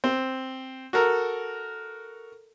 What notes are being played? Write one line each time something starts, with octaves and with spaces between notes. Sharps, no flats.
C4
F#4 A4 A#4